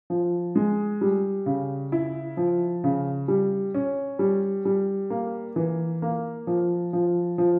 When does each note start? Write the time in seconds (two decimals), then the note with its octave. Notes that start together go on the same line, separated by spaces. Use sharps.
0.10 F3
0.56 G#3
1.01 G3
1.46 C#3
1.92 E4
2.37 F3
2.84 C#3
3.28 G3
3.75 C#4
4.19 G3
4.65 G3
5.10 A#3
5.56 E3
6.02 A#3
6.47 F3
6.93 F3
7.38 F3